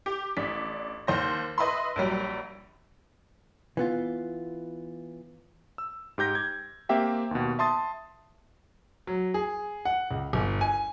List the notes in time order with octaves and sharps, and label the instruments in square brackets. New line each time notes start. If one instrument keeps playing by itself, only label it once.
[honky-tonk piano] G4
A1 D4 B6
D#2 C5 A#6
B4 D#5 E5 B5 C6
A#1 F#3 G3
[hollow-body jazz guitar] E3 B3 F4
[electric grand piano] E6
G#2 G4 G6 A#6
G#6
A#3 C4 G4 E5 G5
D#2 B2
E5 A5 C6 D#6 A6
[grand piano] F#3
G#4
F#5
C#2
G1
G#5